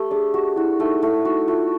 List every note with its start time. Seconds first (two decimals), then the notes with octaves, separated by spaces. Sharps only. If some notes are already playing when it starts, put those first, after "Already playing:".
Already playing: A3 G4
0.11 D4 G#4
0.34 F#4 G4
0.56 E4 F#4
0.79 A3 D#4
1.02 A3 E4
1.25 D#4 F#4
1.47 A3 F4